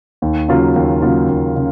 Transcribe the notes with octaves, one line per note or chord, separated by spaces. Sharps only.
D#2
C#3 F#3 A#3 F4
D#2
C#3 F#3 A#3 F4
D#2
C#3